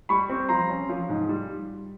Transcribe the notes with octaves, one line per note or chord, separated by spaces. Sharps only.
G3 B5 C#6
C4
F3 A#5 C6
C#4
F3
G#2
G3